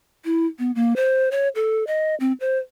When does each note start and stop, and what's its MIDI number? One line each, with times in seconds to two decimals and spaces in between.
0.25 0.46 64
0.59 0.71 59
0.75 0.96 58
0.96 1.29 72
1.31 1.49 73
1.55 1.86 69
1.87 2.15 75
2.20 2.32 60
2.40 2.58 72